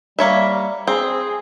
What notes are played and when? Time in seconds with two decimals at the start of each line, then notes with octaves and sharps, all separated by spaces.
0.19 G3 A#3 C#5 E5
0.87 C4 G#4